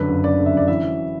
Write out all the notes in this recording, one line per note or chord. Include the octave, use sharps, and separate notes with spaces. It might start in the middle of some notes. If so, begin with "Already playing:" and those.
Already playing: F#2 D3 B4
F#1
F#1 D5
D3
E5
F#2 D5
E3 E5
F#2